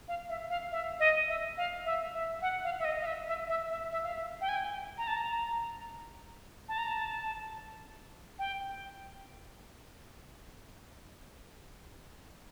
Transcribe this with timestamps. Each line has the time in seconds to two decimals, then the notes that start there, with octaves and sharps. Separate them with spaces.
0.08 F5
0.29 E5
0.50 F5
0.72 E5
1.00 D#5
1.29 E5
1.57 F5
1.85 E5
2.14 E5
2.42 F#5
2.64 F5
2.79 E5
2.85 D#5
3.01 F5
3.06 E5
3.28 E5
3.49 E5
3.70 E5
3.92 E5
4.03 F5
4.13 E5
4.41 G5
4.49 G#5
4.56 G5
4.98 A#5
5.08 A5
5.16 A#5
6.69 A5
6.78 A#5
6.88 A5
8.39 G5